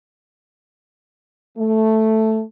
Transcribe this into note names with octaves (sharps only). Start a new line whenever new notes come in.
A3